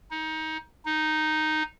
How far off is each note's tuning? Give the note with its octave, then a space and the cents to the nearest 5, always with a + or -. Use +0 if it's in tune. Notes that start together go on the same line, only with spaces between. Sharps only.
D#4 +20
D#4 -5